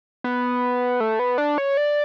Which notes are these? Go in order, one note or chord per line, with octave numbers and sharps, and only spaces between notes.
B3
A3
B3
D4
C#5
D5